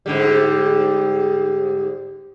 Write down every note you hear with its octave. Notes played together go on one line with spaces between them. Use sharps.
G#2 D3 G3